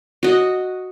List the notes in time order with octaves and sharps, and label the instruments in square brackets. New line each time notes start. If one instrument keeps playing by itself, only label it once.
[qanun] F#4 D#5